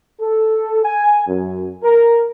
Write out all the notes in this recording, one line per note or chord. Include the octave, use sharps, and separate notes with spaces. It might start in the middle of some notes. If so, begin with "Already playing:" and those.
A4
G#5
F#2
A#4